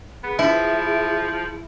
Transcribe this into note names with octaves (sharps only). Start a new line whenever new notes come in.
B3 G#4
F3 E4